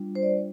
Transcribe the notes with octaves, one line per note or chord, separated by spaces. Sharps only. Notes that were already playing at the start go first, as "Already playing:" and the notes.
Already playing: G3 D4 F4
C5
D5